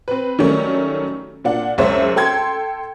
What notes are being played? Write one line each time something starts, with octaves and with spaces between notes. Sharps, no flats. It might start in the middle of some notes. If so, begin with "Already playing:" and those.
C4 B4
D#3 F#3 G3 A3 C#4
A#2 D4 F#5
F#1 C#2 G#3 C5 C#5 E5
A4 G5 C6 G#6